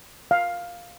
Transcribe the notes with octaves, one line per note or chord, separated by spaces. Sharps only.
F5